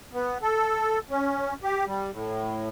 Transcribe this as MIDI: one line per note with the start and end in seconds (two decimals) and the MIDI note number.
0.14 0.38 59
0.42 0.99 69
1.10 1.54 61
1.63 1.85 67
1.86 2.11 55
2.13 2.69 45